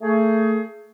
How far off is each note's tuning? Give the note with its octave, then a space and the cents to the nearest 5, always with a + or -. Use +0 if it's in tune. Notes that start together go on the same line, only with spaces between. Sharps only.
A3 +25 G#4 +25